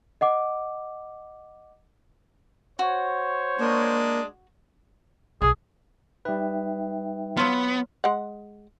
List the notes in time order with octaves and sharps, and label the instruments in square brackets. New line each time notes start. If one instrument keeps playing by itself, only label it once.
[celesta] D#5 F#5 D6
[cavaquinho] F#4 [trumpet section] C5 C#5
[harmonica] G#3 D4 [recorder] A#3
[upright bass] B1 [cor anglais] G#4
[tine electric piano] G3 B4 [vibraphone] D#4 E5 G5
[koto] F#3 F4 [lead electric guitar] B3
[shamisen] G#3 F#5